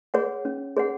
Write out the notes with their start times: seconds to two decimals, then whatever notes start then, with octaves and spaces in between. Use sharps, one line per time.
0.14 G#4 C#5 F#5
0.45 C#4
0.76 G#4 C#5 F#5